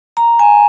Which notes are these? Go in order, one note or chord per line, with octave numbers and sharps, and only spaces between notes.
A#5
G#5